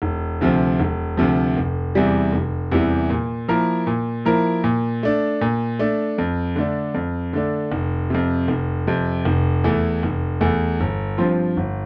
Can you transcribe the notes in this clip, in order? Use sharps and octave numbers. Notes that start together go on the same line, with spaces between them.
E1
D2 C3 F3
E1
D2 C3 F3
F1
E2 C3 E3 G3
F1
E2 C3 E3 G3
A#2
F3 A#3 E4 A#4
A#2
F3 A#3 E4 A#4
A#2
A3 D4
A#2
A3 D4
F2
D3 A3 D4
F2
D3 A3 D4
F1
F2 C3
F1
F2 C3
F1
E2 E3 A3
F1
E2 E3 A3
G1
G2 F3 C4 F4
G1